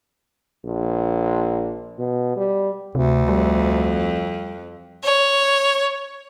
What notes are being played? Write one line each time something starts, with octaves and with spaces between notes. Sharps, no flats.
A#1
B2
G3
D2 C3
F2 G3
C#5